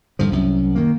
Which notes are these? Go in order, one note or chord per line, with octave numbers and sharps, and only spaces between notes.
G2 D3 F3
C2 F#2
D#3 A#3